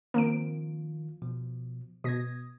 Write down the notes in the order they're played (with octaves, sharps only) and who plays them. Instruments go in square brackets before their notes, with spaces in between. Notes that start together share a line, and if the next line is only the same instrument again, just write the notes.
[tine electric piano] D#3 F3 F4 [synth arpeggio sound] A#3 C4 D7
[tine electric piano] B2 F3
[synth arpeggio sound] B2 A#6 [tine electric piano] D#6 G#6